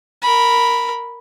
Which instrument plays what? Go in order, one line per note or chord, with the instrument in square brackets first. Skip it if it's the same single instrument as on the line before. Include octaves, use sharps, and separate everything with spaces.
[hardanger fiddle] A#4 B5